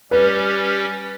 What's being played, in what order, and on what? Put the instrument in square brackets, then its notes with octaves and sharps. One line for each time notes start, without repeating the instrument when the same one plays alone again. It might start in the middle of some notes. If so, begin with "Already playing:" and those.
[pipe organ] G3 C#4 G4 [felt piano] B4